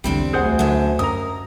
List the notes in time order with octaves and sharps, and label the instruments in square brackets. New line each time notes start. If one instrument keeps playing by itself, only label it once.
[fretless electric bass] B1 E2 D3 [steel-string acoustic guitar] G3 C4 D4
[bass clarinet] D2 [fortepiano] G#4 C5 F#5
[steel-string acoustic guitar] F#2 D3 [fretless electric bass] F#3
[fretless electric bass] F#2 [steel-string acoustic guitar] A#4 [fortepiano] A#5 D#6